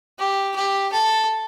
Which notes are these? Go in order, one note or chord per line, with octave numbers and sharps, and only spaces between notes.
G4
G4
A4